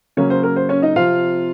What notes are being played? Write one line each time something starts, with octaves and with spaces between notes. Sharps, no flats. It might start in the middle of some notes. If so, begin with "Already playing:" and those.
C#3 F#3 A#3 C#4 C#5
C5
A#4
C5
C#4 C#5
D#4 D#5
C3 F3 C4 F4 F5